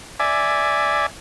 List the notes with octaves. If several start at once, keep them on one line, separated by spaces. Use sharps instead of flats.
D5 E5 G#5